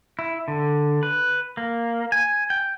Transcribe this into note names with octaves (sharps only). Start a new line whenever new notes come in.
E4
D3
B4
A#3
G#5
G5